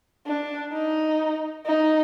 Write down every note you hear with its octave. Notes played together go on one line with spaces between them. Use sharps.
D4
D#4
D#4